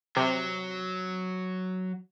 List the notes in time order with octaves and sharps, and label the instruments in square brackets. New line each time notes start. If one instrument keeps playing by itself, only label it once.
[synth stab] C3 [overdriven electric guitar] F#3